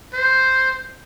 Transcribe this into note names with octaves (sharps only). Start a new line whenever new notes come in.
C5